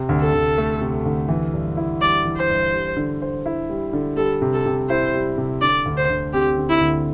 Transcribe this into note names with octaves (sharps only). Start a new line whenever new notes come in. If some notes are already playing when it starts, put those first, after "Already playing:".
Already playing: C3
D2
A4
D2
A3
C3
D2
E3
G2
E4
G3 D5
E3
C5
G2
G3
D3
C5
E4
G3
D3
G3 A4
C3
A4
C3
E4 C5
G3
C3
D3 D5
D2
C5
D2
C4 G4
D3
E4
D2